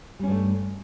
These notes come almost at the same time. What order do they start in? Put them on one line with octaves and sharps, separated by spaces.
G3 C#4 G2 A3